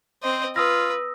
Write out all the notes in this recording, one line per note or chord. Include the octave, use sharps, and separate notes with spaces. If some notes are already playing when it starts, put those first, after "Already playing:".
C4 C5 D#5
F4 B4 D#6 E6 A#6